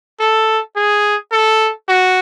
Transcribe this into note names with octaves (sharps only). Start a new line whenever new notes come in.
A4
G#4
A4
F#4